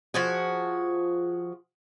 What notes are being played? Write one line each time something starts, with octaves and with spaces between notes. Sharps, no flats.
F3 F#4 G#4